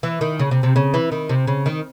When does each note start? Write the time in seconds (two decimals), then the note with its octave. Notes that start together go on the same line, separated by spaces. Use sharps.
0.03 E3
0.21 D#3
0.39 C#3
0.51 C3
0.63 C3
0.76 C#3
0.94 E3
1.12 D#3
1.29 C3
1.47 C#3
1.66 D#3